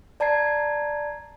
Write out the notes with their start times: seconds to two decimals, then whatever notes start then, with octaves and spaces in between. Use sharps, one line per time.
0.20 D5 A5 A#5 G#6 C7